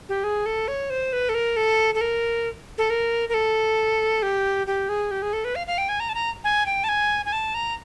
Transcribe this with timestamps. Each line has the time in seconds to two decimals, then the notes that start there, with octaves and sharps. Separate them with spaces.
0.09 G4
0.24 G#4
0.46 A4
0.68 C#5
0.90 C5
1.13 B4
1.29 A4
1.34 A#4
1.57 A4
1.95 A4
2.01 A#4
2.78 A4
2.90 A#4
3.29 A#4
3.34 A4
4.23 G4
4.67 G4
4.89 G#4
5.11 G4
5.22 G#4
5.33 A4
5.45 B4
5.55 F5
5.67 F5
5.78 G5
5.89 G#5
6.00 A#5
6.09 A5
6.14 A#5
6.44 G#5
6.66 G5
6.84 A5
6.89 G#5
7.26 G#5
7.32 A5
7.54 A#5